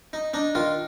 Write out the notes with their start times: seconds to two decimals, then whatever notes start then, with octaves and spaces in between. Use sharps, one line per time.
0.13 D#4
0.34 D4 D#4
0.55 D#3 F4